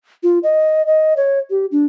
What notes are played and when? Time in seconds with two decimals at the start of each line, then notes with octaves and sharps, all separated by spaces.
0.23 F4
0.43 D#5
0.87 D#5
1.17 C#5
1.50 G4
1.72 D4